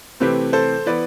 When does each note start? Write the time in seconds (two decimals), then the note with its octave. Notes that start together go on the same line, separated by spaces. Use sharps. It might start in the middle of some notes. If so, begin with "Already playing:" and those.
0.20 C3 E3 A3 C4 G4 B4
0.53 A4 C5
0.86 E3 B3 B4 D5